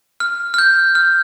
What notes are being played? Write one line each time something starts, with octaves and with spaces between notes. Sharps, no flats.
F6
F6
G6
F6